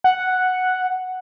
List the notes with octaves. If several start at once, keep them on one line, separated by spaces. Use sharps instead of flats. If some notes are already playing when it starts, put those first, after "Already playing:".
F#5